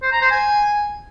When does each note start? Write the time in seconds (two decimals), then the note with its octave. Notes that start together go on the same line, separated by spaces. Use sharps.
0.02 C5
0.12 A#5
0.22 C5
0.31 G#5